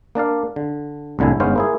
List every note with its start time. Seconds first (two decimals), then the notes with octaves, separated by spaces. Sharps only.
0.15 A#3 D4 D5 F5
0.56 D3
1.19 C2 A2 D3 E4 G#5
1.40 G1 G#2 B3 C#4 C5 F5
1.56 A#3 E4 G#4